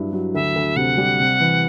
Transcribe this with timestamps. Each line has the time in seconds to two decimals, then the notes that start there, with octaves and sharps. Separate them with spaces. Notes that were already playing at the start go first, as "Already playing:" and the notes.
Already playing: G2 F#3 E4
0.13 F#3
0.34 D2 E5
0.55 D2
0.76 C3 F#5
0.98 G3
1.20 C3
1.40 E3